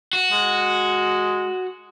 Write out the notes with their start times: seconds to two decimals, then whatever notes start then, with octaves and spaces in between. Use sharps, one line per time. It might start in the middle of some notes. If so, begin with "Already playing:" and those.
0.13 F#4
0.32 G#3